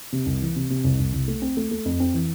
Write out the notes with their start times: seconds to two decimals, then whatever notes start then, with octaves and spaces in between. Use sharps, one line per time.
0.13 C3
0.26 C2
0.42 E3
0.56 C3
0.70 C3
0.84 C2
1.00 C2
1.13 C2
1.28 A3
1.42 C4
1.57 A3
1.71 A3
1.85 F2
2.00 C4
2.14 E3